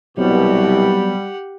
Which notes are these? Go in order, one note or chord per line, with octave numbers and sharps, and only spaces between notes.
C2 B2 F#3 G3 B3 G4 F#5